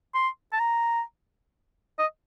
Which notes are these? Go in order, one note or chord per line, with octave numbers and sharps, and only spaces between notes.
C6
A5
A#5
D#5